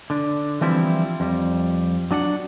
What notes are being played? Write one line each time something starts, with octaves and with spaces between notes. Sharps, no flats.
D3 D4
E3 F3 G3 C4 E4
F2 G3
F#3 D4 D#5 F#5